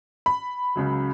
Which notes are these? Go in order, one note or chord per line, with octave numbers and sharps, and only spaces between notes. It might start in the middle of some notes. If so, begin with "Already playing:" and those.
B5
C#2 C#3 F#3